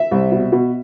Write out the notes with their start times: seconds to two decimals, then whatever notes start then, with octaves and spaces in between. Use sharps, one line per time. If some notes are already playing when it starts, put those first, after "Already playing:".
Already playing: E5
0.11 C2
0.32 B2
0.52 B2